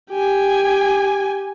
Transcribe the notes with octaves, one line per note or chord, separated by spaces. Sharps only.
G4 G#5